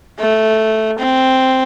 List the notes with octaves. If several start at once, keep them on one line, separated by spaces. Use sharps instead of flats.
A3
C4